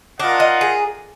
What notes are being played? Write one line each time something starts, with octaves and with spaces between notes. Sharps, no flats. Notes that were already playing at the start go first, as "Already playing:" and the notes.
D4 F4 A#4 D#5 F#5
D#4
G#4